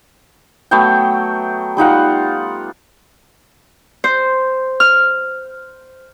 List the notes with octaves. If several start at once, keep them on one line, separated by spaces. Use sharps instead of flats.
F#3 A3 B3 G5
G3 D#4 F4 F#5
C5
F6